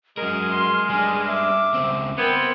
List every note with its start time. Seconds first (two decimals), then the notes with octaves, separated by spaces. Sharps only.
0.18 F#3 G#3 A#4 F6
0.50 C6
0.89 G3 D4 G#5
1.27 E5 D6
1.74 C#2 C4
2.18 B3 C4 A#4 G5 G#6